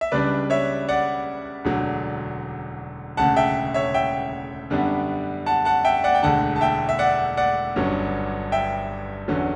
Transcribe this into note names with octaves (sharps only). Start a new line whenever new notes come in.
E5
C#2 C#3 G3 D4 B4 D5
C#5 E5
D5 F#5
E1 D2 D3 F#3
E1 D2 C#3 F#5 A5
E5 G5
C#5 E5
E5 G5
F#2 D3 G3 B3 D4
F#5 A5
F#5 A5
E5 G5
D5 F#5
G5
E1 D2 D3 F#5 A5
A5
E5 G5
E5
D5 F#5
D5 F#5
G1 G2 F#3 C#4
E5 G5
E2 D3 F#3 C#4